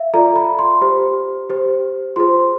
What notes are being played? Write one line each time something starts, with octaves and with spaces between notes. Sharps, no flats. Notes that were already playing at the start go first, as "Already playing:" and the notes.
Already playing: E5 F5
F4 A4 D5 A#5
B5
C6
G4 C5
G4 C5
F4 G#4 C5 C6